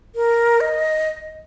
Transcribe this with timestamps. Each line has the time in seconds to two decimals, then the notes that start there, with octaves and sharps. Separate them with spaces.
0.15 A#4
0.60 D#5